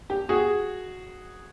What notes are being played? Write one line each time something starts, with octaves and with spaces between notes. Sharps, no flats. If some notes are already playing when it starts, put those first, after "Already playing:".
G4
F#4 G#4